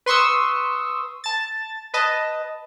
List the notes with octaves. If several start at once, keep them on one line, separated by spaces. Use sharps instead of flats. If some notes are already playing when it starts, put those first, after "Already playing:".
B4 C6 C#6 D#6 E6
A5 A6
B4 D#5 A5